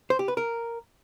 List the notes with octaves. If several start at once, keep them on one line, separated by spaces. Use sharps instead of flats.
C5
G4
B4
A#4